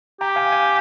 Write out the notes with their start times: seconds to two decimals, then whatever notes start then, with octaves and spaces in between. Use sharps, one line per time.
0.21 G4 G5 A#5
0.36 F5 G#5
0.52 F5 G#5